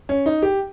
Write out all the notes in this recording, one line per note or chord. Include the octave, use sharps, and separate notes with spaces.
C#4
D#4
G4